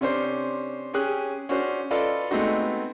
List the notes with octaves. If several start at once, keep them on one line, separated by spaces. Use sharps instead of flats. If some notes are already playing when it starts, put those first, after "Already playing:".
C3 C#4 D4 C5
C#4 G4 G#4 F#6
C#4 D4 F#4 C5
F4 A4 B4 D5 D#5 F5
G#3 A3 B3 C4 D#4 F#4